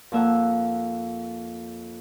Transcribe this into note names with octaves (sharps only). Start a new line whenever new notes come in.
F2 A#3 E5 F#5